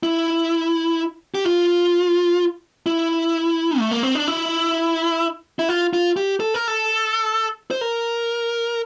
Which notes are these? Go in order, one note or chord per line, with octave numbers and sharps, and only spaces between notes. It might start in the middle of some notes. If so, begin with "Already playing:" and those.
E4
G4
F4
E4
A3
A#3
C4
D4
E4
E4
F4
F4
G4
A4
A#4
A4
C5
A#4